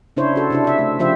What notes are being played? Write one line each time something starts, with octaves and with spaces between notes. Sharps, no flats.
C#3 D4 E4 C5 C#5
F#4 A4
C3 D4 E4
E4 E5
A3
C#3 F3 F4 G4 C5 E5